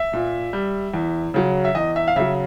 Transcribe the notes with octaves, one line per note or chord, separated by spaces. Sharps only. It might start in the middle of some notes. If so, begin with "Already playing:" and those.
Already playing: E5
A#2
G3
E2
C#3 F#3
E5
E2 D#5
E5
F5
C#3 F#3 E5